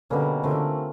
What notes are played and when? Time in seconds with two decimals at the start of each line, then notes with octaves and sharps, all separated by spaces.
0.10 B2 D3 G3 A#3 C#4
0.44 D3 A3 C4 F4 A#4